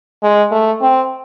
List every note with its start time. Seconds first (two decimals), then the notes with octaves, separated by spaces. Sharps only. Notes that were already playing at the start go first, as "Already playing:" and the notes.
0.23 G#3
0.52 A3
0.82 C4